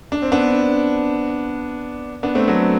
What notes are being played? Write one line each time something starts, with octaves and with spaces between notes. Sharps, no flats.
D4
C4
B3 D4
B3 D4
A3 C4
F#3 A3